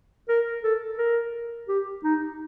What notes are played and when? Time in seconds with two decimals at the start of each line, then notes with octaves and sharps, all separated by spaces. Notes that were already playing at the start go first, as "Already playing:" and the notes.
0.28 A#4
0.63 A4
0.98 A#4
1.68 G4
2.04 D#4